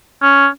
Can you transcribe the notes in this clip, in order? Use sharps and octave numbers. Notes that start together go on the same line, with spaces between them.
C#4